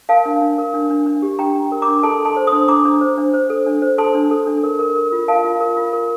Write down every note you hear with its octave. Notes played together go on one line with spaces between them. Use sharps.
A#4 F5 A5
D4
D4
A#4
D4
D4
D4
G4
D4 G5 A#5
D4
A#4
A#5 D6
D4
A4 A5 C6
A4
A5 C6
C5
C6 D#6
D4
D4 A#5 D6
D4
C5
D4
C5
A4
D4
C5
A4 A5 C6
D4
A4
D4
A#4
A#4
A#4
F4
A#4 F5 A5
F4
A#4
F4
A#4